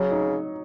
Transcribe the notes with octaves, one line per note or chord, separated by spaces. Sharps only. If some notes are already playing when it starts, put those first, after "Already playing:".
Already playing: C#3 F#3
D#4